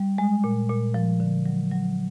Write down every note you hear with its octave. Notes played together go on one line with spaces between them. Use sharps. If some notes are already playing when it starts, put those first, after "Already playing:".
Already playing: G3
G#3
A#2
A#2
F3
D3
F#3
F#3